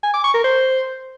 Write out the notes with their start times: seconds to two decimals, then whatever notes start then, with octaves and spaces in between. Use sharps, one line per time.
0.03 G#5
0.13 D6
0.24 C#6
0.34 A#4
0.44 C5